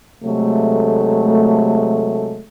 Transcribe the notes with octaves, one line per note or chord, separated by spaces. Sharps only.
C3 F#3 G#3 A3